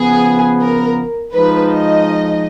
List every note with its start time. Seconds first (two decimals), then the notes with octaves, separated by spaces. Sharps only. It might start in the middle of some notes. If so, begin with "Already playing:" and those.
Already playing: C#3 F3 B3 G#4
0.60 A#4
1.33 F3 G#3 D#4 B4
1.70 D#5